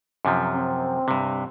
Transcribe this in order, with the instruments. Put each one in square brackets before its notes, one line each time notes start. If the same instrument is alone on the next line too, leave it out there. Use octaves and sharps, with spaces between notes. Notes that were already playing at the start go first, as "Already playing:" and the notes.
[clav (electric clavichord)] F#2 C3 F3
[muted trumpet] C4
[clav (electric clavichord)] G2 C3